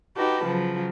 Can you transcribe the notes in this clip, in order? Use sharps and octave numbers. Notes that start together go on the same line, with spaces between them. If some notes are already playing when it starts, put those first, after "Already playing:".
D#4 F#4 G4 A4 B4
C#3 F3 F#3